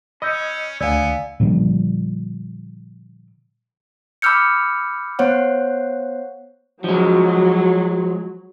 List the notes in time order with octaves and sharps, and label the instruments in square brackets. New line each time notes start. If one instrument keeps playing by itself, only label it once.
[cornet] C#4 [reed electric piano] D#5 [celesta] B5 E6 G6
[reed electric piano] D2 [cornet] B3 [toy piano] D5 [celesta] F5 G#5 E6
[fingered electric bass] A#2 D3 F3 G3
[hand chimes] B5 D6 E6 F6 G6 C#7
B3 C5 C#5 F#5
[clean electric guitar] F3 G#3 [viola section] F#3